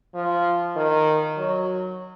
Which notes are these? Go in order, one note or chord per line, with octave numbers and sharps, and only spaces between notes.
F3
D#3
F#3